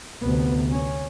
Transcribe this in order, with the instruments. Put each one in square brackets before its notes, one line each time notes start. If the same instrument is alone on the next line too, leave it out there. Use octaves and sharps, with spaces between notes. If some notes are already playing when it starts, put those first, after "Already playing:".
[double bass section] D2 C3 B3
C#4